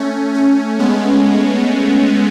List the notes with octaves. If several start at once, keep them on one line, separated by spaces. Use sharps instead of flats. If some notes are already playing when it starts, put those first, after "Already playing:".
Already playing: A3 C#4
A3 C#4
G#3 B3